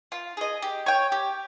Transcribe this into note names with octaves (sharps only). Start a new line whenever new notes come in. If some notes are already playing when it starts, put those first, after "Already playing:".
F4
G#4 D#5
G4
C#5 G5
G4